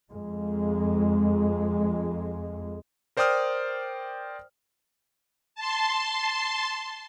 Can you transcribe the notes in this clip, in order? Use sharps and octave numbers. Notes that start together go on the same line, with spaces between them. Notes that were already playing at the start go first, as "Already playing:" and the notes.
F2 G#3
A#4 C5 D5 G5 D#6 F6
A5 C6